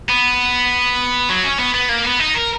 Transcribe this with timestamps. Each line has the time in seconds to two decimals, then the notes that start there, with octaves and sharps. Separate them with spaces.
0.09 B3
1.30 F#3
1.44 C#4
1.59 B3
1.75 B3
1.89 A#3
2.04 B3
2.20 D#4
2.35 A#4